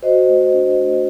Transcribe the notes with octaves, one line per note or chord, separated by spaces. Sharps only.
F#4 C5 D#5
A3
D4
A3